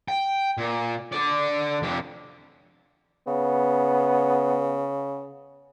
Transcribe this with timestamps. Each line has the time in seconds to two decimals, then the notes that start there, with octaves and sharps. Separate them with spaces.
0.08 G5
0.58 A#2
1.12 D3 D5
1.82 F2 G4
3.27 C#3 B3